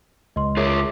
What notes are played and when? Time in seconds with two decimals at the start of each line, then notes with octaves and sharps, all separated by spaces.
0.36 C#2 D#5 C6
0.57 F4 G#4 A#4 C#5 E5